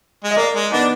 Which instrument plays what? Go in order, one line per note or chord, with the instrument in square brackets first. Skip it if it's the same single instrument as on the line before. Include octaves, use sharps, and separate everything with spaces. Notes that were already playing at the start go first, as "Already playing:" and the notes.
[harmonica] G#3
[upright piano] D#5
[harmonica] A#3 [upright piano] A#4 D5
[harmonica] G#3
[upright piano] B3 D#4 [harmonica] D4